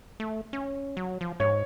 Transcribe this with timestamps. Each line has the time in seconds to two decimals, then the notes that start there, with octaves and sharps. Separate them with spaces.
0.20 A3
0.53 C#4
0.97 F#3
1.21 F3
1.40 G#2 C#5